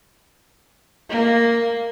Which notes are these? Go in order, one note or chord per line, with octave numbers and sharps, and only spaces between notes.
A#3